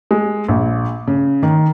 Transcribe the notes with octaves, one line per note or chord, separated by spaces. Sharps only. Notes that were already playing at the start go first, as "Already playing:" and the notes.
G#3
A#1
C#3
D#3